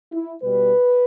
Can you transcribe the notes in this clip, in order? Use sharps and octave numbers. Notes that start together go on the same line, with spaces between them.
E4
B2 G3 B4